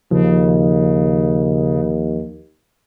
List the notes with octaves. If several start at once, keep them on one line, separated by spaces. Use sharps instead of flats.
D#2 C#3 F3